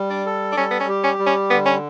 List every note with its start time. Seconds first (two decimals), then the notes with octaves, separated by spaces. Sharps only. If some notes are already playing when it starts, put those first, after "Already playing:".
Already playing: G3
0.10 D4
0.26 A4
0.52 D4
0.57 G3 C#4
0.71 B3
0.80 C#4
0.88 G4
1.04 C#4
1.19 G3
1.27 C#4
1.50 D3 B3
1.65 C#4